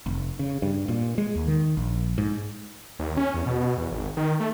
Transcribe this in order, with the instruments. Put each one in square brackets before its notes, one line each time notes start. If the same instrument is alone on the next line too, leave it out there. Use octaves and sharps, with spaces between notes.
[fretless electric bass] F1
C#3
G2
A#2
G#3
D#2
D#3
A#1
G#2
[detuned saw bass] D#2
C#4
E2
B2
B2
E2
G#1
D#3
A3